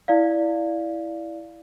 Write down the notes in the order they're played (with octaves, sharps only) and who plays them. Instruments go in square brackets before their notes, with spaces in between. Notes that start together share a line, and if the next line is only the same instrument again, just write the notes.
[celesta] E4 D5 F5